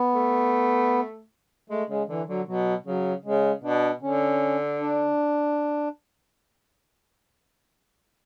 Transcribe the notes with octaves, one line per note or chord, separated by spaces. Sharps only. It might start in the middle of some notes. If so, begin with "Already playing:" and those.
Already playing: B3
A3
G#3 A3
C#3 G#3
D3 E3
D3 F#3
B2 F#3
C#3 F#3
C#3 G#3
B2 D4
D3 C#4
D4